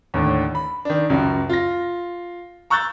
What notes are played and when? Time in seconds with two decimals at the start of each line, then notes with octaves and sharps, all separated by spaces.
0.14 D#2 A2 D3
0.55 B5
0.85 D#3 D4
1.10 C#2 F#2
1.49 F4 A#6
2.70 A#5 C#6 E6 F#6 G6 A6